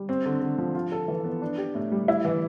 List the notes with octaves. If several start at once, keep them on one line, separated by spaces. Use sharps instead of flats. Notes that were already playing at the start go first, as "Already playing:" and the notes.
Already playing: G3
C4
D3
D3
F3
F4
A4
E3
B3
D4
G4
A2
G3
E4
E3